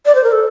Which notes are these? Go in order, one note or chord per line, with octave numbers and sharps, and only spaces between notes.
D5
C5
A#4
A4